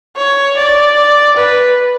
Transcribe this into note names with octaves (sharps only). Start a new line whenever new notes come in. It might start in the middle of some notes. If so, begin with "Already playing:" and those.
C#5
D5
B4